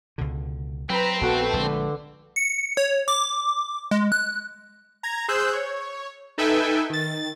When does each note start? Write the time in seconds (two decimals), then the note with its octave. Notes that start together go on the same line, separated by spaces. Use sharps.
0.18 C#2 B2 D3
0.90 F#3 C4 B4 A#5 B5
1.21 A#1 A3 B3 F#4 A4 B4
1.53 A#1 D3 G#3
2.36 C#7
2.77 C#5
3.08 D6
3.91 G#3
4.12 F#6
5.03 A#5 G#6
5.28 G#4 C5 E6 F#6 G6
5.53 C#5
6.38 D#4 A4 B4 E5 G5 G#5
6.90 D#3 A6